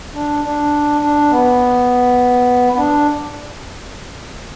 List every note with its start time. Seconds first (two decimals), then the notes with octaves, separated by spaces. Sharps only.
0.14 D4
0.44 D4
1.01 D4
1.31 B3
2.73 B3
2.77 D4